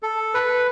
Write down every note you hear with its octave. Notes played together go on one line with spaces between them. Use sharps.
A4
B4